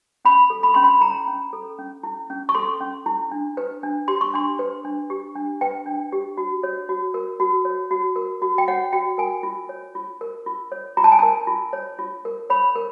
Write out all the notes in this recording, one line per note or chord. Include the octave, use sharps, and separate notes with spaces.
C#4 B5
A4
B5
C#4 C6
B5
E4 A#5
C#4
A4
C#4
E4
C#4
C#6
A4 C6
C#4
E4
D4
B4
D4
G4 C6
C#6
D4 C6
B4
D4
G4
D4
B4 G5
D4
G4
F#4
C#5
F#4
A#4
F#4
C#5
F#4
A#4
F#4
G5
C#5 F#5
F#4 G5
A#4 G#5
F4
C#5
F4
A#4
F4
C#5
F4 A#5
A5
G#5
A#4 A5
F4
C#5
F4
A#4
C#5 B5
A#4